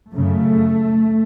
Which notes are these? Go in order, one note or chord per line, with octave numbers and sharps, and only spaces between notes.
F#2 C#3 A3